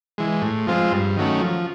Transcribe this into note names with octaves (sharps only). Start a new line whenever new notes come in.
E3 G#3
A2
F3 G#3 C4 F4
G2
D#3 F#3 A3 C#4
F3